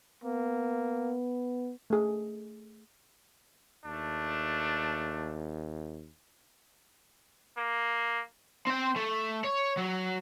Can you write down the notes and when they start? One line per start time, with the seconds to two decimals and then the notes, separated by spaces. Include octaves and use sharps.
0.24 A#3 B3
1.90 A3 G#4
3.85 D#2 A3 D4
7.58 A#3
8.67 C4 G5
8.96 A3
9.44 C#5
9.77 F#3